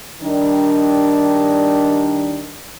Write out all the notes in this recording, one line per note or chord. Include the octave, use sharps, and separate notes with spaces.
D#3 G3 D4